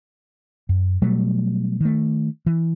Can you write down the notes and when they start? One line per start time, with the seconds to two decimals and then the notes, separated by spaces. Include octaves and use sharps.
0.69 F#2
1.02 B2 F#3 G3 A3
1.81 D#3 A3
2.46 E3